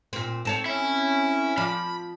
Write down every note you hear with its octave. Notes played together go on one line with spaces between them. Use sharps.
A#2 C4
C4 A4 C#5
C#4 E4
F3 D5 B5